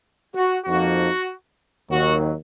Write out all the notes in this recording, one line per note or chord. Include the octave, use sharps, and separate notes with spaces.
F#4
F2 F3 A#3 D#4 F#4
D#2 D#3 F#3 F#4